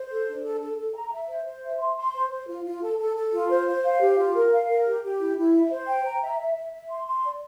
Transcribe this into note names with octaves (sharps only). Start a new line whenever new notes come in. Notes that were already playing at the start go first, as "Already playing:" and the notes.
Already playing: C5
A4
D4
A4
A4
A4
A#5
E5
C5
C5
E5
C6
C6
C5
C5
F4
F4
A4
A4
A4
F4
C5
C5
F5
G4
F4
A#4
F5
A#4
G4
G4
E4
E4
E5
C5
G5
A#5
E5
E5
E5
E5
C6
C6
D5